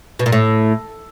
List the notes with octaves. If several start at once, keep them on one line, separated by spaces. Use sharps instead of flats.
B2
A#2
A2